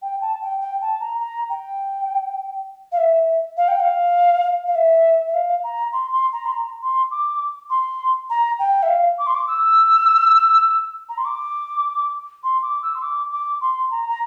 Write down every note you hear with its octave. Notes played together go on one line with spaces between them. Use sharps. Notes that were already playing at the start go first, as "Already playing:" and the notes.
G5
A5
G5
G5
A5
A#5
A#5
G5
F5
E5
F5
G5
F5
F5
E5
E5
F5
A#5
C6
C6
A#5
C6
A#5
C6
D6
C6
A#5
G5
E5
F5
D6
C6
D6
E6
A#5
C6
D6
C6
D6
E6
C6
D6
D6
C6
A#5
A#5